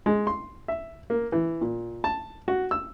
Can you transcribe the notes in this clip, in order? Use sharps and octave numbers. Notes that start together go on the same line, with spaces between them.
G#3
C6
E5
A#3
E3
A#2
A5
F#4
E6